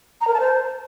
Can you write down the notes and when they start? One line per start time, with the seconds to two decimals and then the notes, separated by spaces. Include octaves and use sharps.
0.21 A#5
0.27 A#4
0.34 A5
0.40 C5